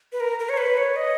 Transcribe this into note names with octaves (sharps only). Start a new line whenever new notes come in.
B4
A#4
A#4
C#5
B4
C#5
D#5